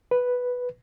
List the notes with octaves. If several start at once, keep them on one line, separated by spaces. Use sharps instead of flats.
B4